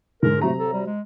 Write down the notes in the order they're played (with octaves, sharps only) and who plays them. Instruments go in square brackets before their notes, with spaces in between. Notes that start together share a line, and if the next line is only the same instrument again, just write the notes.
[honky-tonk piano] G#2 D3 [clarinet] A#4
[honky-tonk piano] C3 F#3 A#5 [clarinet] A3
[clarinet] A4
G3
G#3